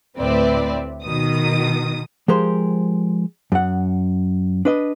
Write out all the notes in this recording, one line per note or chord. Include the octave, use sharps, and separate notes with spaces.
D2 A2 C4 B4 D5 E5
B2 D#3 D#6
F3 G#3 G4 A#4 C5
F#2 F#5
D4 B4 D#5